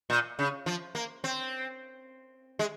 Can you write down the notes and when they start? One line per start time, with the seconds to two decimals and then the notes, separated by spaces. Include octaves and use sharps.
0.10 A#2
0.39 C#3
0.66 F3
0.95 A#3
1.24 C4
2.59 G#3